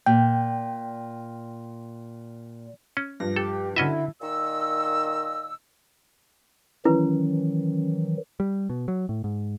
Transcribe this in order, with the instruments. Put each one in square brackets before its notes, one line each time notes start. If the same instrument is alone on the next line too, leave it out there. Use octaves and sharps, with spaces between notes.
[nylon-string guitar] A#2 [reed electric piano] G5
[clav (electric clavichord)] C#4
[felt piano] G2 F3 [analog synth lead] A#6
[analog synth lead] G4 [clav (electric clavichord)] A4
[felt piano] D3 F#4 [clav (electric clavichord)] C#4 D#5 E5 [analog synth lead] E4
[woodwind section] A#2 D#3 D#5 E6
[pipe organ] D#3 E3 F#3 [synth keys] C#4 [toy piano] E4 B4
[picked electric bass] G3
B2
F#3
A2
G#2